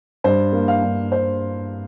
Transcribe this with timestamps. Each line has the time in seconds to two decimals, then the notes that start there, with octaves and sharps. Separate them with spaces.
0.24 G2 C5
0.53 A#3
0.68 F5
0.82 G2
1.12 C5